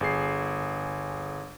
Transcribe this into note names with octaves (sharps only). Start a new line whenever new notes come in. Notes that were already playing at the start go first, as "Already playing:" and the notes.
G1 G#4 C7